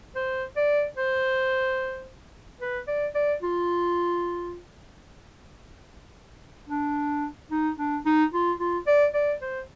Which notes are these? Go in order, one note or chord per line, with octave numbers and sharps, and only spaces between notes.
C5
D5
C5
B4
D5
D5
F4
D4
D#4
D4
D#4
F4
F4
D5
D5
C5